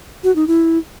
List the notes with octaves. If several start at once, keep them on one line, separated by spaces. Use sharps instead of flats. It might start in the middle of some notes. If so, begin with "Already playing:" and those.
F#4
D#4
E4